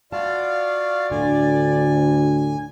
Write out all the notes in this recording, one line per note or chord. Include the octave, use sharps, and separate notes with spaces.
F4 F#4 D5 F5 A5
D2 A2 D3 G#5